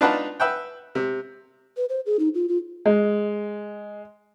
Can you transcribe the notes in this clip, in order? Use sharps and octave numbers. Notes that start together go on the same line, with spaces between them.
D4 D#4 F4 B4 F#5 A5
B4 E5 F#5 G5
C3
B4
C5
G#4
D#4
F4
F4
G#3